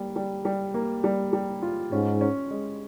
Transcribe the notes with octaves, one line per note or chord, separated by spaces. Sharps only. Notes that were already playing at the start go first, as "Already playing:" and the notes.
Already playing: G3 A#3
G3
G3
A#3
G3
G3
F4
G#2 C#4
C#4
G#3